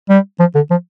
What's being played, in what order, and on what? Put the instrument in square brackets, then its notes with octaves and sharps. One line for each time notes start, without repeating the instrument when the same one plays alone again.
[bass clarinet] G3
F3
D3
F3